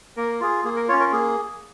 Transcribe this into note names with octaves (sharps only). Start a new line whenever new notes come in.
A#3 A#4
F4 G#4
A#3 G#4
A#4
C#4 F4 C#5
A#4
A#3 G#4